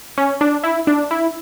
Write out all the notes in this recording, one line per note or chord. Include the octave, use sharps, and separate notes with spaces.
C#4
D4
E4
D4
E4